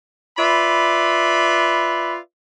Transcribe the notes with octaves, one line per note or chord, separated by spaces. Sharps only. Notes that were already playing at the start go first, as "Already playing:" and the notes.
F4 B4 D5 E5 B5